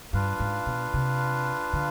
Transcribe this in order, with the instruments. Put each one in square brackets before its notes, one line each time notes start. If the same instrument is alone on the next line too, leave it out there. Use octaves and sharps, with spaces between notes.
[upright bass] G2 [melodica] D4 F4 B4 F5
[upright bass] G#2
B2
C3
D3